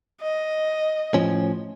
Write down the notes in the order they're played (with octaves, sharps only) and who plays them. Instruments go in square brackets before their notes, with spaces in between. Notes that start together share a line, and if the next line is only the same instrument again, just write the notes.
[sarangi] D#5
[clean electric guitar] A2 F3 C#4